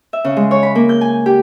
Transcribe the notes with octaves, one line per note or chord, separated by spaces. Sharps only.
E5
C#3
G#3
C#5
B5
A#3
G6
G#5
G4